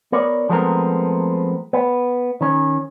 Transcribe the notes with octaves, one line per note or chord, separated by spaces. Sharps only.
B3 A#4 C#5 D5
F3 G#3 A3 B3 C4 A#4
B3
D#3 C#4